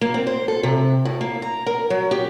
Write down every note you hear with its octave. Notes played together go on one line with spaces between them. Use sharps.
A#3
C4
C5
A4
C3
A2
A#3
A#5
A#4
F#3
G4